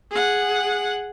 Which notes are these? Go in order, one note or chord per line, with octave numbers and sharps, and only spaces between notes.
G#4 F#5